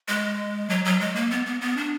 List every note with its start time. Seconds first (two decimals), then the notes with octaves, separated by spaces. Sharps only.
0.08 G#3
0.70 F#3
0.85 F#3
1.00 G#3
1.15 A#3
1.31 B3
1.46 B3
1.61 B3
1.77 D4